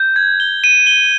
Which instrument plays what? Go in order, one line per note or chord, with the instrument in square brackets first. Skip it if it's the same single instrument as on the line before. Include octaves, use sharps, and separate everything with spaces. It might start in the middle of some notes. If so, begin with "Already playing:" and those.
Already playing: [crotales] G6
G#6
G7
D#7
G7